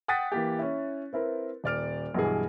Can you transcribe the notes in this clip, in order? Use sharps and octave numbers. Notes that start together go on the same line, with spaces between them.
F#5 G5 D#6 F#6 A6 B6
E3 A#3 G4
C#4 E4
C4 E4 A#4 B4
D#1 D5 F6 D7
B1 G2 E3 G#4